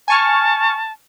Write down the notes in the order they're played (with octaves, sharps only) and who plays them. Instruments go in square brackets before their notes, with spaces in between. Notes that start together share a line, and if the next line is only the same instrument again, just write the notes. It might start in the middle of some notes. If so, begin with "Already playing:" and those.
[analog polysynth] G#5 C#6 F6 [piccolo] A5